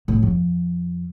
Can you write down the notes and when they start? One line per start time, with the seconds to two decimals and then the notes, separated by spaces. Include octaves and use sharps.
0.08 A2
0.22 F2